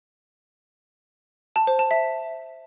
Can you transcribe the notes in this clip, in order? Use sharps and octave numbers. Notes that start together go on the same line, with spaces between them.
A5
C5
A5
E5